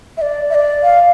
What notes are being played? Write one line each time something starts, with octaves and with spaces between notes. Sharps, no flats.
E5
D5
E5
D5
F5